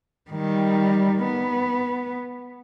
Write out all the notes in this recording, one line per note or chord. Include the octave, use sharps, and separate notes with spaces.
D#3 G3
B3